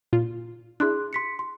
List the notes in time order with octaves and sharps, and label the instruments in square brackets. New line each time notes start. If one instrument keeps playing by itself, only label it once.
[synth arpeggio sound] A#2 F4
[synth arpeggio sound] D4 E4 [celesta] G#4 C6 F#6
[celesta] C6 B6 C#7
C6